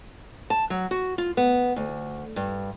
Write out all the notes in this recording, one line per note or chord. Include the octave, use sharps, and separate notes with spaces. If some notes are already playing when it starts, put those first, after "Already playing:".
A5
F#3
F#4
F4
B3
D2
G2